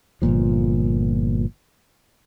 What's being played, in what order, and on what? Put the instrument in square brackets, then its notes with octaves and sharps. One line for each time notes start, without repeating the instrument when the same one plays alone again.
[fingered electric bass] G1 C#2 A#2 F3